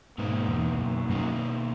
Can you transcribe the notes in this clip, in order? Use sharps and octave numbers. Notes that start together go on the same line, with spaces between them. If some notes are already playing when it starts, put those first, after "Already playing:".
G#2 B2 A#3 D#4
E2
E2
F#2
F#2 B2 A#3 D#4